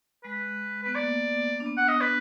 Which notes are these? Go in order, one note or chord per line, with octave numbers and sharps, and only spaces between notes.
G#3 B4
B3 B4
A#3 D5
D4
B3
F#5
D#5
B4